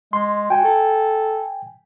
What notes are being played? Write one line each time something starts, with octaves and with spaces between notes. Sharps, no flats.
G#3 C6
F#4 G5 G#5
A4